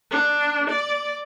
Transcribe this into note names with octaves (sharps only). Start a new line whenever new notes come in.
D4
D5